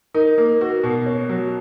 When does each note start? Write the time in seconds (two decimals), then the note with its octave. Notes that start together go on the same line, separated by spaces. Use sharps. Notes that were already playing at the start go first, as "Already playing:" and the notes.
0.14 D#4 A#4
0.38 A#3 A#4
0.61 F#4 B4
0.70 A#4
0.83 B2
0.89 A#4
1.06 C#4
1.29 F#3